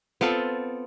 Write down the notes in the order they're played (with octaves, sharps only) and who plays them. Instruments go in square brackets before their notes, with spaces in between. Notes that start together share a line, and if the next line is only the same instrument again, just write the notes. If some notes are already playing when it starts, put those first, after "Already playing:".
[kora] B3 C4 F4 A4